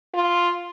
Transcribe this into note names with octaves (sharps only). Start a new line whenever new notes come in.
F4